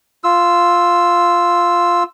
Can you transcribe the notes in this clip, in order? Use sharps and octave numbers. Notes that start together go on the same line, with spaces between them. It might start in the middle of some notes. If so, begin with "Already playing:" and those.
F4 E6